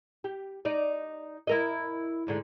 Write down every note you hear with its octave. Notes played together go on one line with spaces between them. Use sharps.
G4
D#4 D5
E4 A#4 D#5
D2 G#2 D3